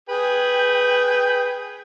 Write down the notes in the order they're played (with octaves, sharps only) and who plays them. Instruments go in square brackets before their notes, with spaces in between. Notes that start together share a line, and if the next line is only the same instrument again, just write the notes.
[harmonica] G#4 B4 [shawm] G5